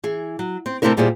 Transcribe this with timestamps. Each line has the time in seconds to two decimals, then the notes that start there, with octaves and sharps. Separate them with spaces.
0.04 E3 G#4
0.39 F#3
0.66 C4
0.82 C3 A3 C4 D4 E4 A#4
0.97 D#2 A#2 G3 E4 G#4 C5